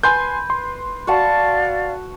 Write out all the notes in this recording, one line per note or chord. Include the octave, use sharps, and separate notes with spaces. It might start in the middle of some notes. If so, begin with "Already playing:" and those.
B4 G#5 C6 G6
C6
F#4 D5 F5 F#5 A5